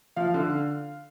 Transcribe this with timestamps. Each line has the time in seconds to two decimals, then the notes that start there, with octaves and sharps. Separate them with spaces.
0.16 F3 F5
0.34 D3